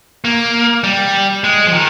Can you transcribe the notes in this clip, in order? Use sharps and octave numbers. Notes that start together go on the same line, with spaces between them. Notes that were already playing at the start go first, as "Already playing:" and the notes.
A#3
G3
G#3
F3
D#3